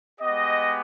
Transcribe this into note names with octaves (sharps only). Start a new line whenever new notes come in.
G#3 B3 G4 D#5